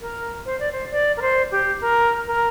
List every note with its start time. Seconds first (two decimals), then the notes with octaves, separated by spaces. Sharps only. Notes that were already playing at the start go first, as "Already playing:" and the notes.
0.01 A#4
0.45 C5
0.59 D5
0.72 C5
0.91 D5
1.17 A#4
1.22 C5
1.51 G4
1.81 A#4
2.27 A#4